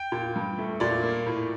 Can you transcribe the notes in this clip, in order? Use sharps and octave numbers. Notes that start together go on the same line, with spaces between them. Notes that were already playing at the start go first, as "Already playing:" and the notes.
Already playing: G5
A#2
G2
A3
A#2 D5
A#3
A2